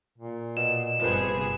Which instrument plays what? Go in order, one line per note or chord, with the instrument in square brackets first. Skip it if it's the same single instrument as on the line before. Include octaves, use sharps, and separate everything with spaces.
[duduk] A#2
[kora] B2 [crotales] E7
[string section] G1 C3 G#4 [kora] F3 A#3 C5 [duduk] B4